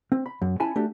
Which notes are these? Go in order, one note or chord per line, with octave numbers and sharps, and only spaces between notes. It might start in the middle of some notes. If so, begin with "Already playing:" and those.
C4
B5
F#2
C#4 E4 G#5 A5 B5
A3 D4 F#4 G4